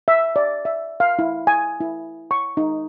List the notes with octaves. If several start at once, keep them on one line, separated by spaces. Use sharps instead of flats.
E5
D5
E5
F5
E4
G#5
E4
C#6
D#4